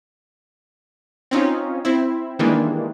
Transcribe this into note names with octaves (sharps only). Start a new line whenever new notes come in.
C4 C#4 D#4 F4
C4 E4
D#3 E3 G3 G#3 A#3 D4